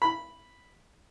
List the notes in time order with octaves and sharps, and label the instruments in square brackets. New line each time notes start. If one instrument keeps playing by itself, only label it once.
[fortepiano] B5